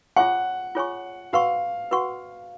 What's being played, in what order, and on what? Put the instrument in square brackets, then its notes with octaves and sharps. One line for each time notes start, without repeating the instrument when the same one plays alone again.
[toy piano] F4 G#4 C#5 G#5 C#6 [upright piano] F#5
[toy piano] F4 G#4 C#5 G#5 C#6
[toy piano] F#4 B4 F#5 C#6 [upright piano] F5
[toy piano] F#4 B4 F#5 C#6